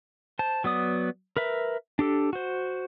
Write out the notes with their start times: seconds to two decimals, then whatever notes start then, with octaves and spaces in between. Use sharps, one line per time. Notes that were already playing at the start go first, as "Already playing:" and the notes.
0.39 C5 A5
0.64 F#3 B3 D5 D#6
1.37 A#4 B4 E5
1.99 D4 G4 A4
2.33 F#4 C5